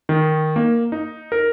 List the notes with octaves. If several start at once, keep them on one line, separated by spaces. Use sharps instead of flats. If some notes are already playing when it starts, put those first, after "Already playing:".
D#3
A#3
D#4
A#4